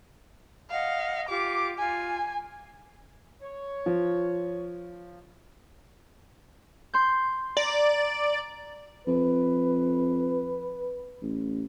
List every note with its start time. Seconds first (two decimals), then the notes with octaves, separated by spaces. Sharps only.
0.70 D#5 F5 F#5
1.29 F4 G4 D6
1.78 F4 G#5
3.42 C#5
3.86 F3
6.94 C6 G6
7.57 D5 A#5
9.07 F2 B4
11.22 A1